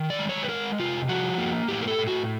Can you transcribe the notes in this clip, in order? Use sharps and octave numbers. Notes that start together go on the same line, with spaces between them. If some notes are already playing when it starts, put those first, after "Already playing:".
Already playing: D#3
D5
G#3
C#5
B4
G#3 A#4
C3 F4
F3 F#4
A#3
A2 G4
A#4
A4
A2
F#4